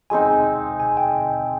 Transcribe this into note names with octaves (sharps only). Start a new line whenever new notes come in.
G#3 C4 D#4 G#5
G#5
G5